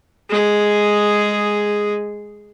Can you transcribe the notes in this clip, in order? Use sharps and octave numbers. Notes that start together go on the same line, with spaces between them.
G#3 G#4